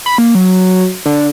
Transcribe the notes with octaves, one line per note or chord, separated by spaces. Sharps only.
B5
A#3
F#3
D3